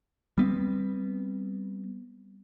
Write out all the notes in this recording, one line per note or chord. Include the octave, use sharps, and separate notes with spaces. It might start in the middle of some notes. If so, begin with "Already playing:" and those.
G3 B3 C4